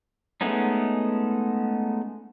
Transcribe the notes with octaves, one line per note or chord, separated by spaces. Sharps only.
G#3 A3 B3 C#4 D#4